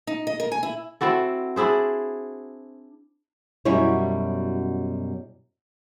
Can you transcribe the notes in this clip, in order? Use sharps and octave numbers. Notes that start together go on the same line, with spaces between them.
D#4
D#5
A#4
G#5
E4
C4 E4 F#4 A4
D4 E4 G#4 C5
F#2 B2 G3 C#4 E4 C#5